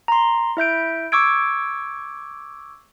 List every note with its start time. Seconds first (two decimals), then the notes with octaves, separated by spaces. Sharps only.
0.08 A#5 C6
0.57 E4 E5 G6 D7
1.12 C#6 D6 E6 G#6 D7